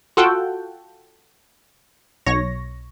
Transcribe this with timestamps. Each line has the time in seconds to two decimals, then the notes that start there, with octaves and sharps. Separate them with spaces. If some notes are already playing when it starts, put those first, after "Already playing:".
0.17 F4 F#4 A4 F#5 G5
2.26 B1 C#5 A#6